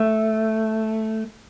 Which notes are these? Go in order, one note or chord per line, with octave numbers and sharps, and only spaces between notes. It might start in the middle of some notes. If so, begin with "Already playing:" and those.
Already playing: A3